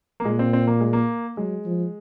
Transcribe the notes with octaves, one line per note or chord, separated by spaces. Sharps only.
A#3
A#2 G#3
C4
C4
A#3
G#3
A#3
F#3 G#3
F3